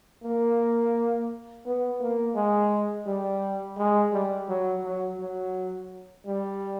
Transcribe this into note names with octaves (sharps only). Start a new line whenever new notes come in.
A#3
B3
A#3
G#3
G3
G#3
G3
F#3
F#3
F#3
G3